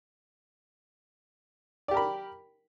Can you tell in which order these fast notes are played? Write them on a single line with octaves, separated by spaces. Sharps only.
D5 G4 A#4 B5